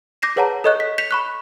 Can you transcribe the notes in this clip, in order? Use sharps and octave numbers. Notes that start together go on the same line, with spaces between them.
D6 G6 A#6 C7 E7
G#4 B4 C#5 F#5 A5 A#5
A4 C#5 D#5 C#6 F#6 G6
B6
G6 B6 C#7 E7 F7
B5 C#6 F#6